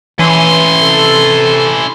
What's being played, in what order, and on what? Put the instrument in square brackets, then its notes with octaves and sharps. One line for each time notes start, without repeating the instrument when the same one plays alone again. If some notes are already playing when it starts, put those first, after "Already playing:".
[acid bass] E3 [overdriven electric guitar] C#4 E4 [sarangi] C6
[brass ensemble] C3 A4